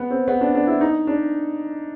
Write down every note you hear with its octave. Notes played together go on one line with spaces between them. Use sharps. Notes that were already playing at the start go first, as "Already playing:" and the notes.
Already playing: B3
C4
B3
D4
D4
E4
D#4
D4